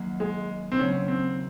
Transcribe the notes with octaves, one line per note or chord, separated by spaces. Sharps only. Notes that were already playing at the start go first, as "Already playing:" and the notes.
Already playing: F#2 D#3 F#3 A#3
G#3
C4
D#2 C#3 F#3 A#3 C#4
C4